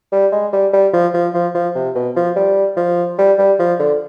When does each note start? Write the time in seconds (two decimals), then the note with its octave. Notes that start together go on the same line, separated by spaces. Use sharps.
0.12 G3
0.32 G#3
0.53 G3
0.73 G3
0.93 F3
1.14 F3
1.34 F3
1.55 F3
1.75 C3
1.95 B2
2.16 F3
2.36 G3
2.77 F3
3.18 G3
3.38 G3
3.59 F3
3.79 D3